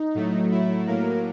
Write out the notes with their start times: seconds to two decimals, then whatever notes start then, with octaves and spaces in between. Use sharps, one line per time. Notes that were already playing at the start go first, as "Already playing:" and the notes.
Already playing: D#4
0.15 A2 F#3 A3
0.51 E4
0.87 A2 F#3 A#3 A#4